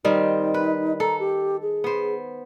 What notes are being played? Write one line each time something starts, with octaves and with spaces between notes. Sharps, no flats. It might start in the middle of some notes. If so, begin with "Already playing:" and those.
D#3 G3 C4 D#4
B4
A4 A#5
G4
G#4
B3 C5